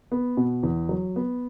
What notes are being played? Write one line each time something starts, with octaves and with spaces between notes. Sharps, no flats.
B3
B2
E2
F#3
B3